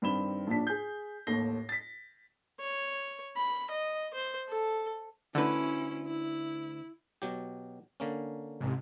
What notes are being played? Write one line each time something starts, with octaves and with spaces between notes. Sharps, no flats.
G2 D#3 C4 B5 E7 G7
A#1 D#2 D4 A5 B6
G#4 G6
A1 D#2 A4 A#6 C7 G7
A6 B6
C#5
B5
D#5
C5
A4
D2 D3 C#4 E4 B4
E4
B2 F#3 G4
D3 A#3 C#4
A1 G#2 C3